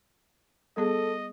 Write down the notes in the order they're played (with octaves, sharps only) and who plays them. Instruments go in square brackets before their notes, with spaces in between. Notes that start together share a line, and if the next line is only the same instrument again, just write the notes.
[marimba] G3 B3 G#4 [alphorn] A4 [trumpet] D#5